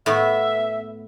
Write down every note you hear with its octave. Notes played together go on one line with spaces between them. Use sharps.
A2 B3 E5